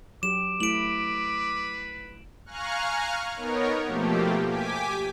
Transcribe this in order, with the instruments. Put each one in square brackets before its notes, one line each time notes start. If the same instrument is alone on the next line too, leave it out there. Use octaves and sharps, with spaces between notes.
[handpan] F#3 G4 [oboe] D6 [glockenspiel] E7
[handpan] A3 E4 [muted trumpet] B4 [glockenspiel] D7 F#7
[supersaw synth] F5 G#5 A#5 C#6 F6 F#6
B3 D#4 A#4 C#5
B2 F3 A3 A#3 G4
G4 G#5 D6 B6